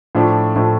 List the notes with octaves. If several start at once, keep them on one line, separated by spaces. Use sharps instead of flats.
A2 F3 A3 D4
A2 F3 A3 D4